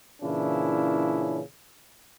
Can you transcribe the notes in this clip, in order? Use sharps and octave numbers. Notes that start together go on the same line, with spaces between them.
A#2 C#3 E3 C#4 D4 E4